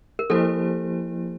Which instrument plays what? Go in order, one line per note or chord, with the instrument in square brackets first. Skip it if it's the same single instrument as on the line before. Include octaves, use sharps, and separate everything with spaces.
[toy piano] A#4
[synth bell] F3 A#3 E4 G4 C5 [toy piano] A4